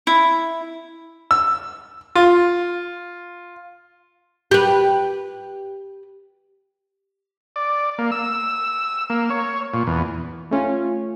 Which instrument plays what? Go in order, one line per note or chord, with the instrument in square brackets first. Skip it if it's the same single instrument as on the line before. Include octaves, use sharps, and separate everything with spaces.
[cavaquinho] E4
[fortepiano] E6
F4
[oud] G4 B4
[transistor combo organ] D5
A#3
E6
A#3
C#5
A#2
E2
[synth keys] A3 C#4 F4